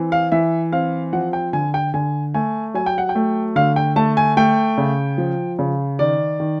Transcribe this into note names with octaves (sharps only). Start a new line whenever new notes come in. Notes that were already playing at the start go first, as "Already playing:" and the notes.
Already playing: E3 C4
F5
E3 E5
C4 F5
F3 F#5
G5
D3 G#5
G5
D3 G#5
A3 G#5
F#3 G#5
G5
F#5
G5
A3
D3 F5
G5
A3 A5
G#5
A3 G5
C#3
F3
C#3
D#3 D5
D#3